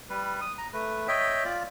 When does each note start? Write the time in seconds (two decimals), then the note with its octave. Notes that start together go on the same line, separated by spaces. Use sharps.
0.10 G3 B4
0.41 D#6
0.58 A#5
0.73 A3 B4
1.08 C#5 D#5 E5 G5
1.45 F4 D5